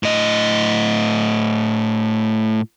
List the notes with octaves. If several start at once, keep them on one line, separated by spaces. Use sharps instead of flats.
A2 D#5